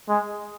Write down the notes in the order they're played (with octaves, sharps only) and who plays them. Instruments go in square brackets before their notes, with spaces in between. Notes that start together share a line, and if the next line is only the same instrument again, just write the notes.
[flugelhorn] G#3